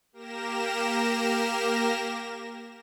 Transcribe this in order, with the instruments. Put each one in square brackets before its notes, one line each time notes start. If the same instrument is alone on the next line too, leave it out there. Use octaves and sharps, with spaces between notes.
[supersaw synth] A#3 G4 A#4 A#6 E7